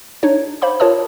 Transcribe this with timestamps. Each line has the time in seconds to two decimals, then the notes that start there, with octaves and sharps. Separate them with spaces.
0.23 D4 D#4 C#5
0.62 C5 F5 B5 D6
0.80 F4 A#4 C#5 A5 D#6